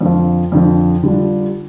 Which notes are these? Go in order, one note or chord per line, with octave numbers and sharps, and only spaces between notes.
F2 D3 F3
F2 D3 F3
D3 G3 D4 F4